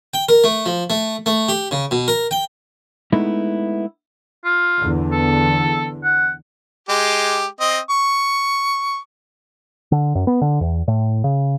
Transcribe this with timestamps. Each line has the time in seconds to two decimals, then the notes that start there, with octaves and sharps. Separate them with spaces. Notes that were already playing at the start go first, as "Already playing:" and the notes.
0.14 G5
0.29 A#4
0.44 A3
0.66 F3
0.90 A3
1.26 A3
1.49 G4
1.71 C#3
1.91 B2
2.08 A#4
2.31 G5
3.12 G#3 A3 B3 D#4 E4
4.45 F4
4.80 E2 D3
5.12 A4
6.04 F#5
6.89 G#3 G4
7.60 C4 D#5
7.90 C#6
9.92 D3
10.15 F#2
10.27 B3
10.41 D3
10.61 E2
10.88 A2
11.24 C#3